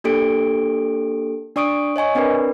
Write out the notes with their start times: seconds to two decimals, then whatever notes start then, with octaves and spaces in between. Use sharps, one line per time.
0.04 A#3 D4 G4 A4 D7
1.56 D4 D5 C#6 D#6 D7
1.96 C#5 D#5 G#5 C#6
2.15 C4 D4 A#4 B4 D5